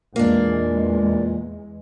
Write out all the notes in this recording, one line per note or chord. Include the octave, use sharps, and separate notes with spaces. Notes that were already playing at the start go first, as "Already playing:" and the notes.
E2 A#2 G#3 A#3 D4